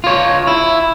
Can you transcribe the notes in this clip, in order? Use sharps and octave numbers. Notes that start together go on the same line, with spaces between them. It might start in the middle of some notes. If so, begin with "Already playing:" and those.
F4 C#5
E4